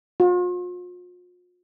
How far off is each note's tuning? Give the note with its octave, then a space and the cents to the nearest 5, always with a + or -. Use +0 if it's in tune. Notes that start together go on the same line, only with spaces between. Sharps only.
F4 +40